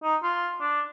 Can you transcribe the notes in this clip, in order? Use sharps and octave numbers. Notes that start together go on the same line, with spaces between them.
D#4
F4
D4